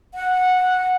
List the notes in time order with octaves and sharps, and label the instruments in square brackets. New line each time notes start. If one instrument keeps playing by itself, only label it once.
[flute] F#5